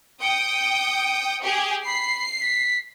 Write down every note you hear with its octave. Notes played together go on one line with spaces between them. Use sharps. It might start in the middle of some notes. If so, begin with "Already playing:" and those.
G5 D#6 C#7
G4 G#4
B5 C7
B6